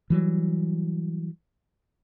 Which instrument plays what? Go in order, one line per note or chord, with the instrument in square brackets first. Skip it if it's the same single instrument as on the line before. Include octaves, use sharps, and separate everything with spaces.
[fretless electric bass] E3 F#3 G3